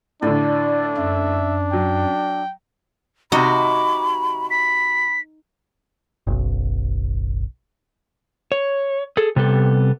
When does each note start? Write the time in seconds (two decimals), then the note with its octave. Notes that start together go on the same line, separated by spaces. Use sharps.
0.22 A2 D3 D4 D5
0.97 F#2 E5
1.73 F#3 G5
3.32 C3 D#4 F#4 B5 D6
4.51 B5 B6
6.27 F#1 B1
8.52 C#5
9.17 G#4 A4
9.36 C3 G3 B3 A4